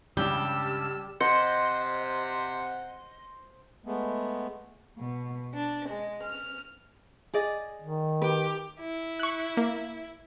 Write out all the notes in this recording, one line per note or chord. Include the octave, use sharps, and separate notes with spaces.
C#2 G2 C#3 G3 G4 A5 E6 F6
C3 C5 D#5 F#5 C#7
G#3 A3 B3
B2
D4
G#3
F6
G#4 D5 D#5
D#3
G4 B4
E4
C#6 F#6
A#3